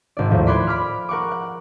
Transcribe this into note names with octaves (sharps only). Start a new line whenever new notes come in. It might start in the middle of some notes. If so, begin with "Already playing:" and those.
G#1 D5
D#2 A2 F3
D5 B5 C6 D6 F#6 G#6
B5 D6 F6
A#4 F#5 C#6 D6
F#5